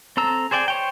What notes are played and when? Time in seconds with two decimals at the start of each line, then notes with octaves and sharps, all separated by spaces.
0.17 C4 A4 A#5 E6
0.51 G#4 C5 D5 G5 G#5
0.68 C5 C#5 G5